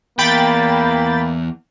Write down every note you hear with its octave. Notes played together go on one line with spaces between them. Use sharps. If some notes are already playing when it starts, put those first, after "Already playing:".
E2 A#3 G5 B5 A6